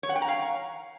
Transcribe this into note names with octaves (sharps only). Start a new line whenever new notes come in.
C#5
F#5
G5
A#5
F5